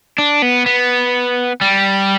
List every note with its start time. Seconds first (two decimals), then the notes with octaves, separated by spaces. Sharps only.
0.18 D4
0.42 B3
0.66 B3
1.61 G3